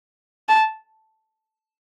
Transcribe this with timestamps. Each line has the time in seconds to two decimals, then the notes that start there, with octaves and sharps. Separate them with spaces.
0.49 A5